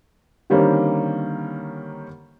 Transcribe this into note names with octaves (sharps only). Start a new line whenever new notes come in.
D3 D#3 G3 A#3 C4 C#4